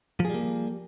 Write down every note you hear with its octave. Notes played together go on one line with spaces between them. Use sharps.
F3 G3 A#3 G#4